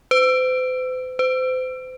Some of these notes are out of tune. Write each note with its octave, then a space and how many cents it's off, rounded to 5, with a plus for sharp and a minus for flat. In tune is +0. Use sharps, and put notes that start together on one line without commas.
C5 -45
C5 -35